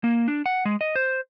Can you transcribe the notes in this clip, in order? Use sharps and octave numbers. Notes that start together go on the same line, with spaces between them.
A#3
D4
F#5
G#3
D#5
C5